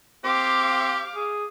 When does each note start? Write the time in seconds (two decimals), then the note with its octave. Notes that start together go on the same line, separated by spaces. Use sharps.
0.24 C4 G4 F5 D6
1.15 G#4